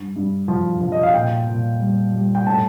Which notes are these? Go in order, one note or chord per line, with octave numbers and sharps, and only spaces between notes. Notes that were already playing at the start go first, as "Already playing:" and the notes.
Already playing: G2
G2
F3
F3
D#5
F5
A#2 G5
A#2
G3
G3
G5
A2 A5